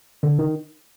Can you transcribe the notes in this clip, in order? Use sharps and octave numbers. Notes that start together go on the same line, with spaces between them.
D3
D#3